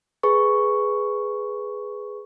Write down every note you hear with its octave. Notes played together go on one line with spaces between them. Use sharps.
G#4 B4 C#6